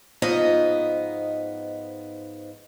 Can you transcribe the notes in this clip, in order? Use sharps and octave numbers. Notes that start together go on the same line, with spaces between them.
G#2 F3 B3 D#4 D#5 A#5